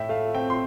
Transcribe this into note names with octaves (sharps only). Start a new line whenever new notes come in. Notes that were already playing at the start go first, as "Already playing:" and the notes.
Already playing: A2 E5 G5
A3 F5
C4 E5 G5
C6